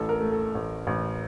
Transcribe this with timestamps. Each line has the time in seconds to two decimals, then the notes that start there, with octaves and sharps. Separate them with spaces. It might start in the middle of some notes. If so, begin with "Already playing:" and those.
Already playing: A1 A4
0.09 A#4
0.21 A3
0.32 A4
0.55 A1
0.87 A1